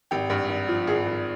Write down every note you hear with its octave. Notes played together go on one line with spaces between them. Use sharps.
G#1 G4
G2
G#1
F3
G#1 G#4
G#1